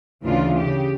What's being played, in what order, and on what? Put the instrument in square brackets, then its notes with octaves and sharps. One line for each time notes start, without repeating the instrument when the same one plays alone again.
[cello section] D2 C#3 E3 D4 F4
C#3 G4